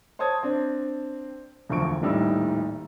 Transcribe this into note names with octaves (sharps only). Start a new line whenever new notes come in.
C5 C#5 A5 D#6 G#6
C4 D4
E1 D2 F3 C#6 D7
D#1 A#1 A2 G3 D#4 E6